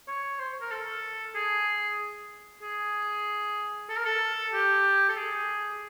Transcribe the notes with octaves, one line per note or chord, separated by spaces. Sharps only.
C#5
C5
A#4
A4
G#4
G#4
A4
A#4
A4
G4
A4
G#4